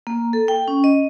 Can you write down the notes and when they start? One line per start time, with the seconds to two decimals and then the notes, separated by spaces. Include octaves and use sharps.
0.07 A#3
0.33 A4
0.48 G5
0.68 C#4
0.84 D#5